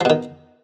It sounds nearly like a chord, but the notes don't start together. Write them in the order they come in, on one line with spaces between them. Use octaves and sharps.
F3 B2 D#3